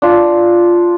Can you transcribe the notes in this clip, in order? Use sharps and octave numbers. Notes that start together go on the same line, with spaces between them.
D4 F4